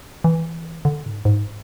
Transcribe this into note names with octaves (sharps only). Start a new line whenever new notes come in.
E3
D3
G#2
G#2